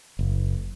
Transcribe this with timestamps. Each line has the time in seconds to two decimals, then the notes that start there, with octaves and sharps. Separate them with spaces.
0.19 F#1